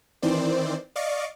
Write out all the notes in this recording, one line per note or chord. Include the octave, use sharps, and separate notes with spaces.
D#3 E3 C4 C5 D5
D5 D#5 F5 C#6 D6